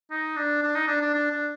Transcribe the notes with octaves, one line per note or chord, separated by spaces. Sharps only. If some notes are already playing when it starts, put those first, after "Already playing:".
D#4
D4
D4
D#4
D4
D4
D4
D4